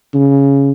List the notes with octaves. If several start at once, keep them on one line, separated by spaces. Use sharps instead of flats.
C#3